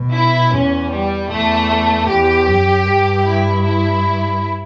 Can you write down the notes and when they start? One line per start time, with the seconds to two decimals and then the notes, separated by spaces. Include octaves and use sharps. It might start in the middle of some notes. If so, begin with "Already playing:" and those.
Already playing: B2
0.14 E4
0.53 E2 C#4
0.92 G3
1.30 E2 A3
2.08 E2 G4
2.47 F#2
2.86 G2
3.25 E4
3.64 E4